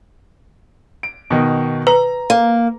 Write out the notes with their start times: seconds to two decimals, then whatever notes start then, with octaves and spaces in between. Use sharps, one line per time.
1.03 D7
1.30 B2 D#3
1.87 B4 A#5
2.30 A#3